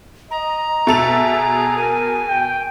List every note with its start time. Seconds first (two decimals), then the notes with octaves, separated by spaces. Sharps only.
0.31 D#5 A#5
0.87 B2 G#4 A4 E5 F7
1.77 A#4 G#5
2.28 G5